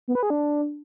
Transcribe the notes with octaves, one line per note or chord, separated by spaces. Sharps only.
B3
B4
G#4
D4